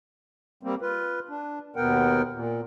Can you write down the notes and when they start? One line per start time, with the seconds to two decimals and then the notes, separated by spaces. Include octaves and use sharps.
0.63 G3 A#3 C4
0.82 F4 B4
1.29 D4
1.76 D#2 B2 B3 A#4 F#5 G5
2.32 A#2